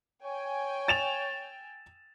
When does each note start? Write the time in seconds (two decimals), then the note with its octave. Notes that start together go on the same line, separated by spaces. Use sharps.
0.23 C#5 G5 G#5
0.88 A6 E7 F7